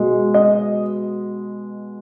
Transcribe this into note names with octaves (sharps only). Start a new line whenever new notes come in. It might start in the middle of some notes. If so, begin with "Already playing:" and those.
Already playing: B2 G#3
D#5